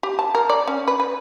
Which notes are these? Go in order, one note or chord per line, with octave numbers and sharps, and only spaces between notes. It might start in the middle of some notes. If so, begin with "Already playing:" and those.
G4
A5
A#4
D5
C#4
B4
B4